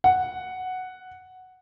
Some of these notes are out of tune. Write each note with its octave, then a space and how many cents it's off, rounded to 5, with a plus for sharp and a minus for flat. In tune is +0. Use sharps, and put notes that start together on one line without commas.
F#5 +0